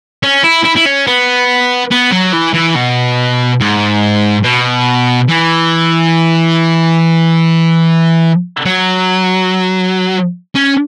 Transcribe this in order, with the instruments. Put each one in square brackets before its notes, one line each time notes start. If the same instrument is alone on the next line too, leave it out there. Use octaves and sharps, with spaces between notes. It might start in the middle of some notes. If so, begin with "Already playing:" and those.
[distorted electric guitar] C#4
E4
E4
E4
C#4
B3
B3
F#3
E3
E3
B2
G#2
B2
E3
F#3
C#4